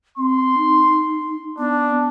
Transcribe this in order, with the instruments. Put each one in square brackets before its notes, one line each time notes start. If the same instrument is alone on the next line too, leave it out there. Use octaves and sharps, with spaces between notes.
[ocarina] C4 [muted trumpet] C6
[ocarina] D#4
[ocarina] B3 [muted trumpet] D4